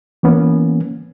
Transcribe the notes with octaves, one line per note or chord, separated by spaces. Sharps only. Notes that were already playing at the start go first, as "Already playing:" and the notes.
E3 A#3 B3 C#4